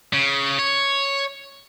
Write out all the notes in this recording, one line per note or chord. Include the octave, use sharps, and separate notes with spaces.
C#3
C#5